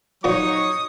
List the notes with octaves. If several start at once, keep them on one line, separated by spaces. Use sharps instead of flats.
A#2 F3 F#3 D#4 C#5 F#5 C#6 D#6